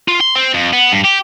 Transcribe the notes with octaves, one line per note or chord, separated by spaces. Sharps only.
F4
C6
C4
F2
B3
G2
G4